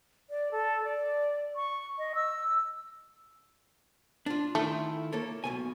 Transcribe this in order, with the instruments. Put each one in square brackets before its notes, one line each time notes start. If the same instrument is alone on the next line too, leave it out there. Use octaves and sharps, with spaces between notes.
[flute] D5
A4
D5
C#6
D#5
E6
[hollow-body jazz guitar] D4 F4
[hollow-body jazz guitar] D#3 E4 F4 [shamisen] A3
[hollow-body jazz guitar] A#3 A4 C#5
B1 B2 G#5